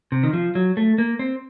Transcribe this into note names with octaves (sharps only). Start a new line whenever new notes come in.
C3
D#3
F3
F#3
A3
A#3
C4